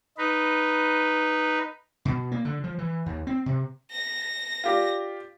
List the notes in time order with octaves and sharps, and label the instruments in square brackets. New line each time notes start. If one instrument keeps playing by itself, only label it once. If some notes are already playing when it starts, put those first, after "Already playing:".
[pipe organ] D#4 B4
[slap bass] B2
A#3
D3
F3
E3
D#2
C4
C3
[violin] A#6
[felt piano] F4 G4 D5